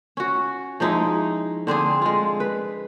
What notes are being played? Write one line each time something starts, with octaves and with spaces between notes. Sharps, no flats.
C#4 F#4
F3 G#3 D#4 E4
D3 C4 D4 G#4
G#3 F4
B4